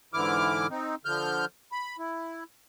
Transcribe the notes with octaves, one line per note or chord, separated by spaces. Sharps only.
G#2 D3 E3 E4 D6 F6
C4 D#4
D3 F3 F6 G6
B5
E4